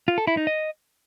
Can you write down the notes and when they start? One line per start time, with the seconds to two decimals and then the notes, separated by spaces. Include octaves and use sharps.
0.08 F4
0.18 A4
0.27 E4
0.37 D#4
0.47 D#5